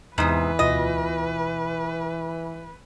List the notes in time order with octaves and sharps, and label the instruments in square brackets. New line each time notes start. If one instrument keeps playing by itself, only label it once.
[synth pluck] E2 D#6 [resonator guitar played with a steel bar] G#2 C3 [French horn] E3 [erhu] B4
[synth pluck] D2 B2 F4 [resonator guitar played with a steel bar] D#5